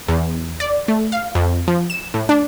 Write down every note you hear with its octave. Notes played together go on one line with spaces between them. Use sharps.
E2
D5
A3
F5
F2
F3
E7
A2
D4